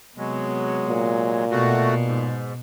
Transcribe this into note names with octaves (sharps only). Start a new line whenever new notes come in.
C3 F#3 G#3 B3
A#2
B2 A3 F#4
G#2